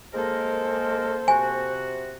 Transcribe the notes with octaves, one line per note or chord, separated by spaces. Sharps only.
G#3 A#3 A4 A#4 C5
C3 F#4 G#5